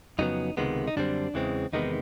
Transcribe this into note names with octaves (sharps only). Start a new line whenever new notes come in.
F2 C#3 F#3 B3 D#4
C#2 C3 D#3 G#3 B3
D#4
F#2 D3 G3 C4 D4
E2 C#3 E3 G#3 C4
E2 C3 D#3 G#3 B3 D#4